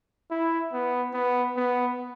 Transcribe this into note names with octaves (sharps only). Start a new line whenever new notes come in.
E4
B3
B3
B3